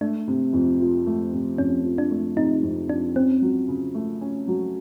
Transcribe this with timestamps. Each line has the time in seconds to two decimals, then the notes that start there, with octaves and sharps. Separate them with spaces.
0.01 A3 D4
0.28 C3
0.53 F2
0.80 F3
1.06 A3
1.33 C3
1.58 F2 C#4
1.84 F3
1.98 D4
2.11 A3
2.37 C3 D#4
2.63 F2
2.89 F3 D4
3.15 C4 C#4
3.42 F#3
3.68 C#3
3.95 A3
4.21 C#4
4.48 F#3